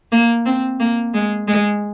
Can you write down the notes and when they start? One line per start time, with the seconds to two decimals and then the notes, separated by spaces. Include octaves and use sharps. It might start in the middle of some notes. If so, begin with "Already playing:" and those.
0.12 A#3
0.46 C4
0.80 A#3
1.14 G#3
1.48 G#3